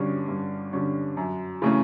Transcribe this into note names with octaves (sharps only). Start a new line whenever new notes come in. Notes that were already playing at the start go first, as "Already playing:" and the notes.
Already playing: G2 D3 G3 C#4
G2
D3 G3 C#4
F#2
C#3 E3 A3 C#4